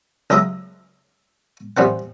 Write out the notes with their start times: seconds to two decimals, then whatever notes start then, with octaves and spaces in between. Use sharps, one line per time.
0.30 C#2 F#3 D#5 E5 A#5 D#6
1.77 A1 G3 C4 F#5